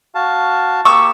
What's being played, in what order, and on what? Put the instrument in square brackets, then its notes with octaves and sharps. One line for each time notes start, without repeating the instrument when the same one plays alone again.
[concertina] F#4 F5 A5
[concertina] A#3 G4 [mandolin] C#6 D#6 E6